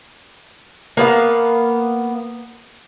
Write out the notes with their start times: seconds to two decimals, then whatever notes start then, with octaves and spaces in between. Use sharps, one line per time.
0.97 A#3 B3 F5